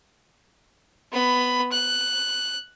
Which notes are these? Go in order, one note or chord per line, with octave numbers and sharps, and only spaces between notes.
B3 B5
F#6